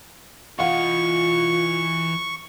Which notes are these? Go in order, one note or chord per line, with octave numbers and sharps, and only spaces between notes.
E3 F4 D#5 F5 F#5 C#6